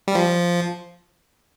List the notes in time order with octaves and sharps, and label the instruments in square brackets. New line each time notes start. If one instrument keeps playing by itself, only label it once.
[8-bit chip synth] G3
F3